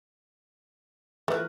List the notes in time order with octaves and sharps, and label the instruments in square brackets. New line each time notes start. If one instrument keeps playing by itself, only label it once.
[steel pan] E3 A#4 B4 [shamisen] F3 A3